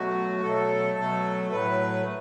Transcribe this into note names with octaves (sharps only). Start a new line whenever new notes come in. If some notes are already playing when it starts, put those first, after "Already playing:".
Already playing: B2 F#3 A3 F#4
B2 F#3 A3 A4
B2 F#3 A3
A2 F#3 A3 B4